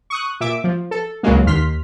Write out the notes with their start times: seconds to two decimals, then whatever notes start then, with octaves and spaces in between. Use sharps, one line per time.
0.10 C#6 D#6 F#6
0.40 A#2 E5 D6
0.64 F3
0.91 A4
1.23 C#2 C#3 F#3 G#3 A#3
1.47 D#2 C6 F6 B6